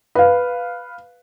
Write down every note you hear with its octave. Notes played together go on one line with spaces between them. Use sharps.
B4 F5